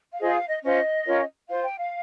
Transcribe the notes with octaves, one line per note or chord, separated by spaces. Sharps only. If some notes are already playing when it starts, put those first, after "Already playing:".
F5
F4 G#4 C5 D#5
F5
D#5
C#4 F4 C5 D#5
C#4 F4 A#4 C#5
F4 C5 F5
G5
F5